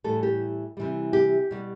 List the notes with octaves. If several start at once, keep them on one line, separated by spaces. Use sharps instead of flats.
A2 E3 G3 A4
G4
C3 E3 G3
G4
B2 G3